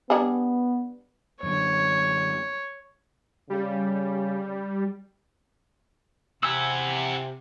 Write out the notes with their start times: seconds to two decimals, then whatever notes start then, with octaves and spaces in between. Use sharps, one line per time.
0.10 G3 B3 D4 G#4
1.43 F#2 D3 C#5
3.50 C#3 G3
6.43 C3 E4 F#5 G#5 E6